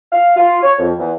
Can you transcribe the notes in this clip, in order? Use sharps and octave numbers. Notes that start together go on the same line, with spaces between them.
F5
F4
C#5
F2
E2